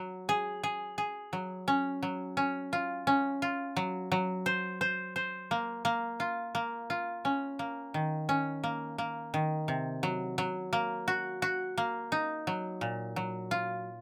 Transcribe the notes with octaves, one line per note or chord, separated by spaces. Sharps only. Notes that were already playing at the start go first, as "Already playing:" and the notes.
Already playing: F#3
G#4
G#4
G#4
F#3
C#4
F#3
C#4
F4
C#4
F4
F#3
F#3
C5
C5
C5
A#3
A#3
F4
A#3
F4
C#4
A#3
D#3
C#4
A#3
A#3
D#3
C3
F#3
F#3
A#3
F#4
F#4
A#3
D#4
F#3
A#2
F#3
F4